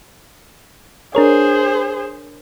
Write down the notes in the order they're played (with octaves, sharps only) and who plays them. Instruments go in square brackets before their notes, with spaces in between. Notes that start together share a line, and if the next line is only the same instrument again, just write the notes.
[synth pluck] D4 A#4 C#5 [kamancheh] G#4 C5